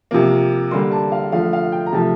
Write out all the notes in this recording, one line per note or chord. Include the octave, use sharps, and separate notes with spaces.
C3 F3 A#3
D3 G3 A#3 C6
A5
F5
D3 F3 A3 F5
F5
G5
A#5
C3 F3 A3 A5